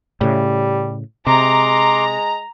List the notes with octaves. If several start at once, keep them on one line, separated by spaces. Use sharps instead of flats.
A2 C#3 G3
C3 G#3 A#5 C6 D6